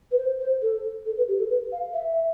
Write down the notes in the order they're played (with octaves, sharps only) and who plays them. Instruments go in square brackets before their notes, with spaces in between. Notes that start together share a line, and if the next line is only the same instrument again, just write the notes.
[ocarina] B4
C5
C5
A4
A4
B4
G4
A4
B4
F5
E5